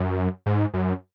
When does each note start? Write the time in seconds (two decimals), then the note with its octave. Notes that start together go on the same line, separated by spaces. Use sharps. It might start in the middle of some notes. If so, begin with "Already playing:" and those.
Already playing: F#2
0.46 G#2
0.74 F#2